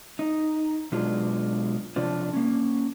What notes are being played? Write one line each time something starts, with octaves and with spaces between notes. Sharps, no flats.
D#4
B2 F#3 G#3 D4 F4
C3 F3 D4 F4
A#3 C#4